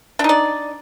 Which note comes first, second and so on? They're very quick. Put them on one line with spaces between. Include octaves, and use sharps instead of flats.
D4 D#4 D5